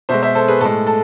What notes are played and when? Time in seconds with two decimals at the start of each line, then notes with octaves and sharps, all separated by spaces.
0.09 B2 G#3 C5 E5
0.23 C5 E5
0.35 A4 C5
0.48 G#4 B4
0.61 A2 G#3 A4
0.87 A4